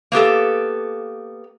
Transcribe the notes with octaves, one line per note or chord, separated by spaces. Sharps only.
A#3 B3 G4 A4